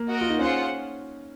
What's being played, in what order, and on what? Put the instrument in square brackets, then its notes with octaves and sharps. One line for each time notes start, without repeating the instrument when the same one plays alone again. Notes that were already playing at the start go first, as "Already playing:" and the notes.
Already playing: [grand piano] A#3
[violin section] F#4 A#4 D#5
[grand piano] F4
D#4
[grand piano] C#4 [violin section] F4 G#4 C5 F#5